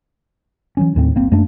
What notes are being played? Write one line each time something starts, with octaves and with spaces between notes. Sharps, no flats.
E3 F#3 C#4
D#1 D#2 A2 C4
G1 A#3 C4
F#2 A3 A#3 D4